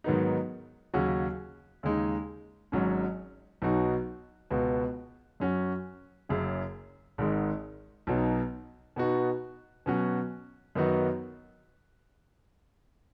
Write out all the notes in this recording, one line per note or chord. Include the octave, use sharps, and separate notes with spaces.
G#2 D#3 F#3 B3 D#4
D#2 C#3 F#3 C#4 F#4
D#2 C#3 G#3 D#4
G#1 G#2 F#3 C#4
B1 B2 F#3 D#4 F#4
C#2 B2 B3 F#4
F#2 F#3 C#4 F#4
F#1 F#2 C#3
G#1 G#2 D#3 G#3
B1 B2 F#3 D#4
B2 B3 D#4 F#4
B2 F#3 C#4 F#4
F#2 D#3 B3 D#4 F#4